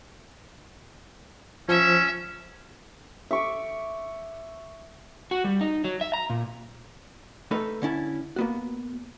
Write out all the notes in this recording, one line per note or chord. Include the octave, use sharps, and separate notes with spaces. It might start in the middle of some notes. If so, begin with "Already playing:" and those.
F3 C#4 E5
E5 C#6 D6
F#4
G3
D#4
F#3
E5
A#5
A#2
A3 D#4 A4 B4
D3 C#4 E4 A5
A#3 B3 F#4